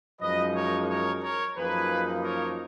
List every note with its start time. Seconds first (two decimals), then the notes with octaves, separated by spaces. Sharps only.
0.21 F#2 F3 G#3 D#4 B4 D#5
0.55 A#4 C#5
0.89 A#4 C#5
1.23 A#4 C#5
1.57 F#2 F3 A#3 D#4 G#4 B4
2.25 A#4 C#5